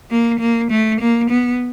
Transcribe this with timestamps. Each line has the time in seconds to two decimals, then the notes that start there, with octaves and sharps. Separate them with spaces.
0.10 A#3
0.40 A#3
0.71 A3
1.00 A#3
1.30 B3